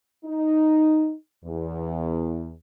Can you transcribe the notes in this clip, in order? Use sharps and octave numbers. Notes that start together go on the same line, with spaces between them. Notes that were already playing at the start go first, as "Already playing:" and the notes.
D#4
E2